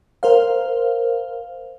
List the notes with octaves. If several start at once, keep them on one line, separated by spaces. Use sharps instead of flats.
A#4 C5 F5